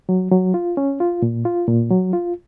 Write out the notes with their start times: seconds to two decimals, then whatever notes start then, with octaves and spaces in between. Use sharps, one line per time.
0.09 F#3
0.31 F#3
0.54 F4
0.77 C#4
1.00 F4
1.22 A#2
1.45 F4
1.68 A#2
1.90 F#3
2.13 F4